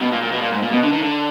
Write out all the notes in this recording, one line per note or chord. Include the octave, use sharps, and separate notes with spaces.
B2
A#2
A#2
B2
A#2
G#2
A#2
B2
D3
D#3
D3